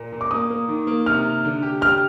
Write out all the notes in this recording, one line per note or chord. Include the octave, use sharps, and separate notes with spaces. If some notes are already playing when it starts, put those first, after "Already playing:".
Already playing: A#2
A#2
D6
A#3 D#6
A#3
D#3
A#3
C3 F6
C3
D3
G4
G4 F6